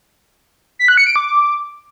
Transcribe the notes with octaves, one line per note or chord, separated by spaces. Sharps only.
B6
F#6
C#7
D7
D6